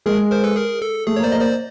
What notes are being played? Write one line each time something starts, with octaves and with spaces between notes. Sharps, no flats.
G#3 G#4 A#4
A#4 C5
A4 B4
G#4 A#4
A4
A3 G#4
C#5
A#3
C5 D5
A#3 D#5
C5 D5